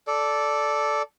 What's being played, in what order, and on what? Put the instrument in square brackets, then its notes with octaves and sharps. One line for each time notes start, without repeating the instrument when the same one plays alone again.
[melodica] A4 D5